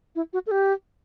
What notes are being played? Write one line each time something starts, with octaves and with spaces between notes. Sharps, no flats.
E4
F#4
A4
G4